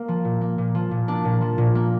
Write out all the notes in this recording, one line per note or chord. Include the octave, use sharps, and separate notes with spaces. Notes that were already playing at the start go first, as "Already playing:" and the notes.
Already playing: A#3
F3
A#2
A#3
A#2
F3
A#2
A#3 D4
A#2
F3
A#2
A#3